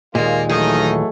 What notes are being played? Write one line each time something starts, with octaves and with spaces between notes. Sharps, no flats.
D#2 A#2 G#3 A#3 F4
D#3 E3 F#3 A3 D#4 G#4 D#5